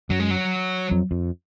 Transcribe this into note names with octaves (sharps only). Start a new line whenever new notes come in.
F#2 F#3
G#3
F#3
F2
F2